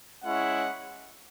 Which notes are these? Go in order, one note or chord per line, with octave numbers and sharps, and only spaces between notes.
G#3 C#4 E4 F#5